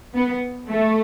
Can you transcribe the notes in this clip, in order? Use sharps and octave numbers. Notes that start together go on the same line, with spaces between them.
B3
A3